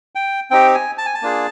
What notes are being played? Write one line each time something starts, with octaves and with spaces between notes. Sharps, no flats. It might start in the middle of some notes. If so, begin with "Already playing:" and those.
G5
C4 D#4 G4 G5
G#5
A5
G#5
A5
A#3 D4 F4 G#4